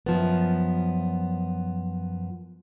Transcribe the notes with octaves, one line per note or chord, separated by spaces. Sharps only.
F#2 F3 B3